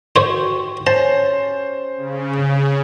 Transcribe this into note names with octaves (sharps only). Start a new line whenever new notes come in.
F#4 G4 C5 C#5
C#4 C5 A5
C#3